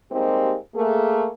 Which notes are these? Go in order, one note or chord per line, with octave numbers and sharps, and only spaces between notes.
G3 G#3 A#3 C4 D#4 G4
A3 A#3 G#4